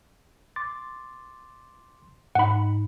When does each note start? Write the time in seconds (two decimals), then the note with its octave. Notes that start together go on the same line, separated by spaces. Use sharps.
0.56 C6 D6 A6
2.35 G#2 D#4 F#5 B5